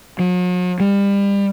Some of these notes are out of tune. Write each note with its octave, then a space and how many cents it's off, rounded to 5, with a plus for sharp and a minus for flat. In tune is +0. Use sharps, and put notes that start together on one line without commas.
F#3 -45
G3 +30